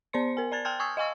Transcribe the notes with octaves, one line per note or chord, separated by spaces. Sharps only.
B3 C5 D5 C6 C#7
A#4 G#5
D5 A5 G#6 A6
G5 A5 C6 F6 G6 G#6
G#5 C#6 D#6 E6 G#6
D#5 F5 G#5 C#6 E6